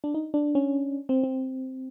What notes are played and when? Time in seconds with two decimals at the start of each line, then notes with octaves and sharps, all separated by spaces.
0.04 D4
0.14 D#4
0.34 D4
0.55 C#4
1.09 C4
1.24 C4